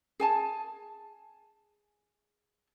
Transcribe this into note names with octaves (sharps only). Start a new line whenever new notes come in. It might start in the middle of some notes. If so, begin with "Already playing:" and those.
G#4 G#5 A5